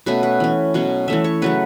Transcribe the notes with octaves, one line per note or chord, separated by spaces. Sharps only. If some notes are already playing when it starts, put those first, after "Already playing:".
B2 A3 C#4 B4
B4
E3 C#4
B2 F#3 C#4
E3 A3 C#4 E5
C#5
C#3 F#3 A3 B4